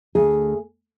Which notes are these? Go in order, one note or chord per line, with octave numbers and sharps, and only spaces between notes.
D2 G#4